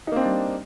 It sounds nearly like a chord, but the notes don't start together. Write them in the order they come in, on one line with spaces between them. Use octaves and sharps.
D#4 A#3 C4 D4 G3